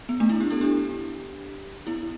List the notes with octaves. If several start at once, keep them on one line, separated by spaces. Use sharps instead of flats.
B3
A3 D4
B3 E4
D4 G4
E4 A4
D4 G4
B3 E4